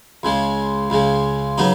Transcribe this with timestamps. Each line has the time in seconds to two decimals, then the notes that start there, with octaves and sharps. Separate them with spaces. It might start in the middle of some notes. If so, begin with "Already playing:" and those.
0.23 C#2 C#3 G#3
0.90 C#2 C#3 G#3
1.58 C#3 F#3 B3 D#4